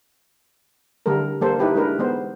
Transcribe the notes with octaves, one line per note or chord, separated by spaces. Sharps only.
D3 G3 A3 A4 A#4
G3 A#3 A4 C5
D#4 E4 G4 B4
G#3 D4 A#4 B4
G#3 B3 C5